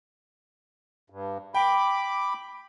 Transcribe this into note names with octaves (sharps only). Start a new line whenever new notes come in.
G2
G5 B5 D6